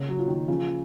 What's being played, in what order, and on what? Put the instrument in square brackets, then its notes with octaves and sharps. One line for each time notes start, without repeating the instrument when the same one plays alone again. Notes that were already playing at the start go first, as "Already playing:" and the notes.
Already playing: [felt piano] C#3 A#3
[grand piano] F#3
[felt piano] F4
[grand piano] D#3
[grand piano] C#3 [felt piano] F3